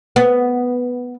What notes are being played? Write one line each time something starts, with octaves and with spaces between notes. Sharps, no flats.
B3